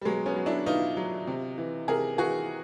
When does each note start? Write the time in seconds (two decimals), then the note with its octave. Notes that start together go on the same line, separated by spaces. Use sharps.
0.01 G3
0.05 B2 F#3 G#3
0.26 B3 C#4
0.36 F#3
0.46 D4 E4
0.66 B2 D#4 F4
0.97 F#3
1.27 C3
1.58 E3
1.88 C3 G#4 A#4
2.18 E3 F#4 G#4